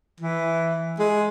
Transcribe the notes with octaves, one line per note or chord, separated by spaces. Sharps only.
E3
G#3